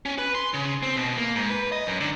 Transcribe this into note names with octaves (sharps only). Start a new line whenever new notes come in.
C#4
B4
C6
C#3
C4
B2
A#3
G#2
B4
D#5
F#2
D3